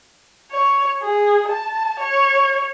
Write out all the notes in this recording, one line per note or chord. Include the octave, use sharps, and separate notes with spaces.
C#5
G#4
A5
C#5